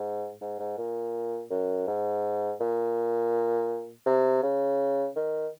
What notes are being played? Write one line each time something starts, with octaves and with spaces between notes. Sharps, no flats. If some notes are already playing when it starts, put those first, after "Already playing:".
Already playing: G#2
G#2
G#2
A#2
F#2
G#2
A#2
C3
C#3
D#3